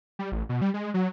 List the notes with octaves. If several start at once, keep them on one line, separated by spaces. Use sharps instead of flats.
G3
A1
B2
G3
G#3
F#3